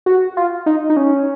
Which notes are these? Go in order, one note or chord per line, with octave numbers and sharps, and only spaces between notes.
F#4
F4
D#4
D#4
C#4